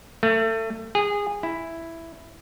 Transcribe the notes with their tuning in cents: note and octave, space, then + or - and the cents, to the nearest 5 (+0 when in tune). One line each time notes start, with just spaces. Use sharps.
A3 +25
G#4 -20
E4 +5